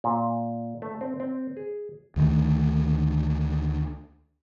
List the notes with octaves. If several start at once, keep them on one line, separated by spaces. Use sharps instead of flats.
A#2
A3
C4
C4
G#4
D2 D#3 F3 A3